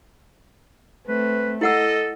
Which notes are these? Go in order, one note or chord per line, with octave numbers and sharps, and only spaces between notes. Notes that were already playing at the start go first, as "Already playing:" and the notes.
A3 C4 B4
E4 A4 D#5 F#5 E6